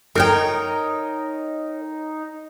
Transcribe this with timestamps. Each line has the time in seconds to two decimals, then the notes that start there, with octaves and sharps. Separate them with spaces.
0.15 D#4 A#4 C#5 G5